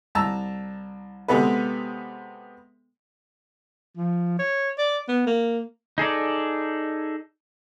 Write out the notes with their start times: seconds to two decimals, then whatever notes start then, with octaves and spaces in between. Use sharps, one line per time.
0.15 C2 A5 A#5 E6
1.28 C3 G#3 B3 A4 B4
3.97 F3
4.39 C#5
4.78 D5
5.08 B3
5.27 A#3
5.98 D#4 G#4 A4 D5